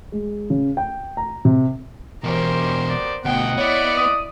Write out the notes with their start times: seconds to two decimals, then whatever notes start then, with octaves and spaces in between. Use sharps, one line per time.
0.12 G#3
0.50 C#3
0.77 G5
1.17 A#5
1.45 C3
2.24 E2 B2 C#4 G4 A#4 C5
2.87 B3 G4 D5
3.25 D2 B2 B3 D#5 F#5 G5
3.57 B3 E4 C#5 D5
3.96 D#6